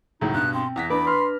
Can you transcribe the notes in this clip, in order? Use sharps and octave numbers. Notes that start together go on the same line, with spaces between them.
C#2 A2 F#3 D#4
G2 B2 F#6
C4 C6
E2 F#5 A#6 B6
D4 B4 B5 D6
C6 F6